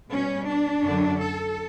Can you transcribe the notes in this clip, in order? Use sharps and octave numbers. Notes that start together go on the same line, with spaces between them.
B2 G3 C#4
D4
F#2 D3 F#3
A4